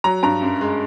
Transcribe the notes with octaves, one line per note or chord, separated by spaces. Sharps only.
F#3 A#5
G2 A#5
F#2
G#3